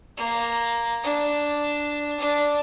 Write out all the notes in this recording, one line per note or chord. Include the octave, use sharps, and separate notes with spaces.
A#3
D4
D4